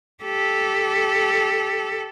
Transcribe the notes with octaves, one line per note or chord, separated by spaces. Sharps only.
G4 A4